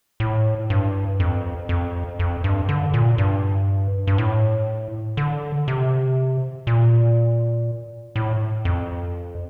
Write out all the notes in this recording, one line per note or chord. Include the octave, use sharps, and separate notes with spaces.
A2
G2
F2
F2
F2
G2
D3
A#2
G2
G2
A2
D3
C3
A#2
A2
F2